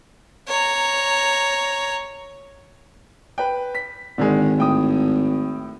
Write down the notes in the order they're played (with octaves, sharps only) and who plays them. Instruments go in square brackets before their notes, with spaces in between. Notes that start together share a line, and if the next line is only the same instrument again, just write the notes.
[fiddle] C#5 A#5
[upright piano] B4 G5
B6
[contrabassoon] G#1 [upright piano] D3 D#3 G#3
[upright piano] A2 G5 D#6